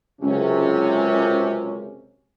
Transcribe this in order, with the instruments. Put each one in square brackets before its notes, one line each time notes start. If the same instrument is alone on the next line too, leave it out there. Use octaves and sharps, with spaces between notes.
[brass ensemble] C#2 F#2 C3 C#4